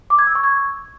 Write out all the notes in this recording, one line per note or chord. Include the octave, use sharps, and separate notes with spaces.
D6
G#6
E6
C#6
G#6